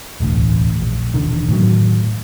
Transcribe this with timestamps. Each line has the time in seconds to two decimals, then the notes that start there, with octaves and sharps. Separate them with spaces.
0.20 E1 A1 D2
0.81 A#1
1.14 E1 A#1 D3 D#3
1.48 A2 D#3 F#3